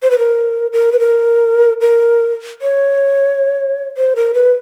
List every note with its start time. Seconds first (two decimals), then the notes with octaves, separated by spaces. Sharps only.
0.02 C5
0.11 B4
0.18 A#4
0.73 A#4
0.92 B4
0.99 A#4
1.81 A#4
2.62 C#5
3.97 C5
4.16 A#4
4.34 B4